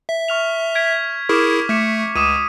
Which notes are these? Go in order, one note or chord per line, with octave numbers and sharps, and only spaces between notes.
E5
C#6 F6 F7
G#6 B6 D7
E4 G#4 A#4 C#6 D6
A3 D6 B6 C#7
C#2 D6 D#6 D#7